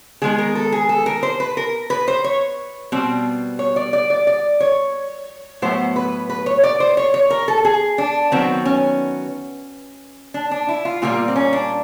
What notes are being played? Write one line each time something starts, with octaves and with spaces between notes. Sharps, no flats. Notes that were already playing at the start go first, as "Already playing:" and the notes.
D#3 G#3 B3 G#4
A#4
A4
G#4
A4
A#4
C5
B4
A#4
B4
C5
C#5
B2 G3 C4
C#5
D5
D5
D5
D5
C#5
A2 F#3 B3 C5
B4
B4
C#5
D5
C5
C#5
C#5
A#4
A4
G#4
D4
D#3 F#3 B3 C4
C#4
D4
D4
E4
F4
A#2 G3 A#3 F4
C4
C#4
D4